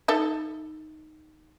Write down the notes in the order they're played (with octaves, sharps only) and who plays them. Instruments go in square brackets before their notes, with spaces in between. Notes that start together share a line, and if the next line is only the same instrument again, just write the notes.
[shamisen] D#4 A4 E5